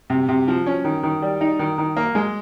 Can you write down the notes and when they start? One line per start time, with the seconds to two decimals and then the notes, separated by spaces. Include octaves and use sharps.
0.10 C3
0.29 C3
0.48 F3
0.66 C#4
0.84 D#3
1.03 D#3
1.22 G3
1.41 D#4
1.59 D#3
1.78 D#3
1.97 A#3
2.15 G#3